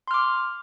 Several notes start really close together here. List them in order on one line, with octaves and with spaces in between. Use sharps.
C6 F6 D6